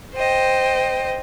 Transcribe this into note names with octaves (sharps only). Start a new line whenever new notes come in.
C5 D#5 G5